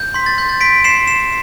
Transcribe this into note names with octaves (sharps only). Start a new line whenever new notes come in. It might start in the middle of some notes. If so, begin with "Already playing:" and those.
Already playing: G6
C6 B6
A6
C6 G6
A6
C6 B6 D7
C6 C7 E7
C6 C7 E7